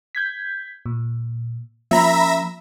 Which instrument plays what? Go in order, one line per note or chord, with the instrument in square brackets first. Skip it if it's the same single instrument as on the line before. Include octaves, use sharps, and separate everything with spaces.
[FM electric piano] G6 G#6 B6
A#2
[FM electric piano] F3 A#3 C#4 [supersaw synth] E5 A#5 B5